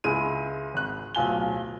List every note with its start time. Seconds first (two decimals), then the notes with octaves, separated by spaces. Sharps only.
0.04 C#2 G#3 E4 D#7
0.74 G#1 F#6
1.15 D1 B1 F4 G#5 G7